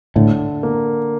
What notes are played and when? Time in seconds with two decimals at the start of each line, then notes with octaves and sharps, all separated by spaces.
0.15 A2 D3
0.63 A#3